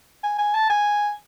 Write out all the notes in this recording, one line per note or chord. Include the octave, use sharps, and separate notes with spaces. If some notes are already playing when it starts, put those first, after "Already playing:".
G#5
G#5
A5
G#5